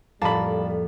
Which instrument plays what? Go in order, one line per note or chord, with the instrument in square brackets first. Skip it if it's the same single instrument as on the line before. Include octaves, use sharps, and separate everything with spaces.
[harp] F2 A2 [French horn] G3 [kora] A#3 [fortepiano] A5 B5